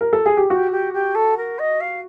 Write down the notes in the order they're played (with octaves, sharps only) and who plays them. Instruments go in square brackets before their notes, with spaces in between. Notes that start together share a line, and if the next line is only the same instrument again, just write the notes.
[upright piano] A#4
A4
G#4
G4
[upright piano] F#4 [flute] G4
[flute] G4
G4
A4
A#4
D#5
F5